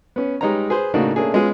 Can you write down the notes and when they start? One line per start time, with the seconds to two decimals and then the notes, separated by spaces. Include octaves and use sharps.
0.16 B3 C#4
0.41 G3 G#3 D#4 B4 C#5 A#5
0.70 G#4 B4 C5
0.94 A2 C#3 A#3 D4 D#4 F#4
1.15 A3 A#3 C#4 D4 G#4 A4
1.34 G#3 B3 C#4 F4 G#4